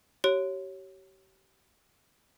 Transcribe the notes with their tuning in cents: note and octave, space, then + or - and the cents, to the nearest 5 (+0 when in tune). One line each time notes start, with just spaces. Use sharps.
G4 -35 C#5 -5